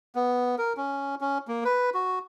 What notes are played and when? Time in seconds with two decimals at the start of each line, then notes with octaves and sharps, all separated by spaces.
0.15 B3
0.58 A#4
0.77 C#4
1.21 C#4
1.48 A#3
1.65 B4
1.94 F#4